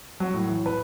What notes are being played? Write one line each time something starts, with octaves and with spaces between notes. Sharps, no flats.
F#3
A2
E3
B4